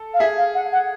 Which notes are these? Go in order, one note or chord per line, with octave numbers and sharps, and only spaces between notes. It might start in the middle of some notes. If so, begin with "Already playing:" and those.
Already playing: A4
F5
G#4 E5
F5
F#5
F#5